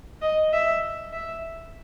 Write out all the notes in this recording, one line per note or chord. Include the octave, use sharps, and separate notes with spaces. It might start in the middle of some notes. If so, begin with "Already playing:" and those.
D#5
E5
E5